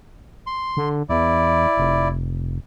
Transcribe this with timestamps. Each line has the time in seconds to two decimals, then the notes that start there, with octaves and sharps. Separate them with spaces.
0.47 C6
0.77 D3
1.09 E2 E4 D5
1.78 F1